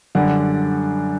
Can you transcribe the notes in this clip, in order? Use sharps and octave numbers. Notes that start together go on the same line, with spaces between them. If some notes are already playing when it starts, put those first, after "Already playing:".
F#2 D3 G3 D5 F#5